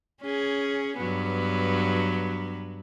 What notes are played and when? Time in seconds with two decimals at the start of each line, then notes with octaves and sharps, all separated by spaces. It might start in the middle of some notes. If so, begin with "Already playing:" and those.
0.21 C#4 G#4
0.98 G2 F#3 B3